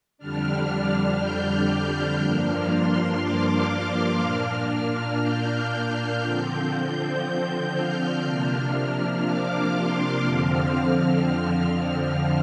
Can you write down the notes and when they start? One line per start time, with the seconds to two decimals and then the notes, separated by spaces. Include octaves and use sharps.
0.18 F2 D3 G3 D4 F6
1.19 G6
2.19 G2 F3 A#3 D4 F6
2.69 C6
3.20 D6
3.70 F6
4.21 A#2 A#3 D4
5.21 G6
5.72 G6
6.22 D3 F3 C4
7.22 G6
7.73 F6
8.23 C3 F3 A#3 D4
9.23 D6
9.74 C6
10.23 F2 D3 F3 C4 F6
11.75 F6